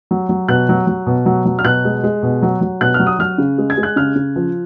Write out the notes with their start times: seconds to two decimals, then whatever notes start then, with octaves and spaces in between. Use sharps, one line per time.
0.11 F#3
0.29 F#3
0.49 B2 F#6
0.69 F#3
0.87 F#3
1.06 B2
1.26 F#3
1.46 F#3
1.59 F6
1.64 B2 F#6
1.85 G#3
2.04 G#3
2.23 B2
2.42 F#3
2.61 F#3
2.81 B2 F#6
2.94 F6
3.00 F#3
3.07 D#6
3.19 F#3 F6
3.38 C#3
3.58 G#3
3.70 G#6
3.78 G#3
3.83 F#6
3.96 C#3 F6
4.15 C#3
4.36 F3